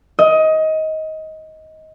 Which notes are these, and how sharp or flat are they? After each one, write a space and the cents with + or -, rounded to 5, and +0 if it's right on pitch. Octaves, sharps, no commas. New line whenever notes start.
D#5 +20